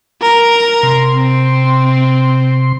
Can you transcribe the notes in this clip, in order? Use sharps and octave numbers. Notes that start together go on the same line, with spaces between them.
A#4 A#5
C3 C6
C4